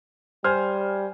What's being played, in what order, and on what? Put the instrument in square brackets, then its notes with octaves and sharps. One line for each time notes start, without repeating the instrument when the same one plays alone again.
[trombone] G3 [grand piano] C5 G#5 F6